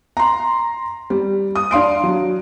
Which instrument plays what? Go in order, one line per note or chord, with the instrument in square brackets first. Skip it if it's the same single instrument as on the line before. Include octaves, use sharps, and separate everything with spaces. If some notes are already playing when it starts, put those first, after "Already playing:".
[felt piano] A#5 C6
G3
D#6
D4 F5 C6 D7
F#3